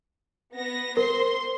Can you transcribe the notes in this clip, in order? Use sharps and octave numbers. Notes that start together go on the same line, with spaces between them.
B3 A#6
A#4 C5 C6